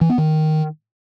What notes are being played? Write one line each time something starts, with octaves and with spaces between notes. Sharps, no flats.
E3
B3
D#3